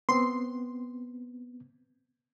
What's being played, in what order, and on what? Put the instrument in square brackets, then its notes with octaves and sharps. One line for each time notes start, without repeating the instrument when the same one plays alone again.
[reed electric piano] B3 C4 [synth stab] C6